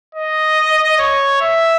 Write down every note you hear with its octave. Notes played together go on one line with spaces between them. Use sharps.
D#5
C#5
E5